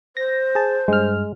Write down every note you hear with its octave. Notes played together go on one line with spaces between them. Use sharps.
C5 A#6
G#4 A5
G2 G#3 F6